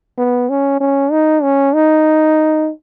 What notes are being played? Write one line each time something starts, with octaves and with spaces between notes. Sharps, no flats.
B3
C#4
C#4
D#4
C#4
D#4